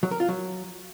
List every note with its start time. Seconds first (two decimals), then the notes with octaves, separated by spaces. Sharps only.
0.03 F#3
0.11 A#4
0.20 F4
0.28 F#3